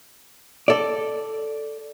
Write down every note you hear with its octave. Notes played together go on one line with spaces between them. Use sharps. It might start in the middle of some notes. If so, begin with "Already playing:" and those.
A4 D5